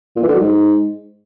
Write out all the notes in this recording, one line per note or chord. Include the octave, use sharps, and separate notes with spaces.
A#2
E3
D3
F#3
G#2